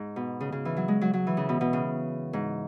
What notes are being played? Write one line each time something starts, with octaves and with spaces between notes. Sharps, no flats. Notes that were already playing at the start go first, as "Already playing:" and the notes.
Already playing: G#2
B2
C#3
C#3
E3
F#3
G#3
F#3
F#3
E3
C#3
B2
B2
C#3
G#2